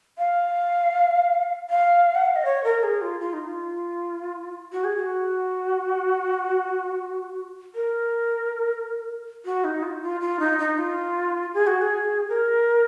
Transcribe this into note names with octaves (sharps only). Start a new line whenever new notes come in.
F5
F5
F#5
F5
D#5
C#5
A#4
G#4
F4
F4
D#4
F4
F#4
G#4
G#4
F#4
A#4
F#4
D#4
F4
F4
F4
D#4
D#4
F4
G#4
F#4
G#4
A#4